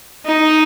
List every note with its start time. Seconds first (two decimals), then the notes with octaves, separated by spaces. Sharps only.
0.26 D#4